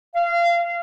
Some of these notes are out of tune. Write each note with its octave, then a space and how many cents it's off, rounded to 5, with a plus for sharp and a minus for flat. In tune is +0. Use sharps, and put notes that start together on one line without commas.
F5 -25